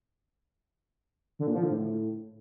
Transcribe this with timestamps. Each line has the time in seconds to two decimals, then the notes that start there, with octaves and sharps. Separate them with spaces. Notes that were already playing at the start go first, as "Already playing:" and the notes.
1.39 D3
1.47 A#2
1.55 F3
1.63 D3
1.71 A2